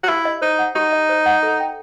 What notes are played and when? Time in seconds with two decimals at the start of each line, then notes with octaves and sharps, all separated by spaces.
0.03 F#4
0.09 E4 G4
0.25 D#5
0.41 D#4 C5
0.59 F#5
0.75 D#4 G4
0.93 D#5
1.09 C5
1.26 F#5
1.43 A4
1.60 G5